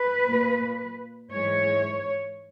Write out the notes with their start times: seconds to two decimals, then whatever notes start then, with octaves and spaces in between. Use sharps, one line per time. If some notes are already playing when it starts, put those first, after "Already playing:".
Already playing: B4
0.26 A#2 A#3
1.31 G#2 E3 G#3 C#5